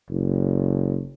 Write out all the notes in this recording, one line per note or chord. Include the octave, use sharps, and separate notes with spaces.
F#1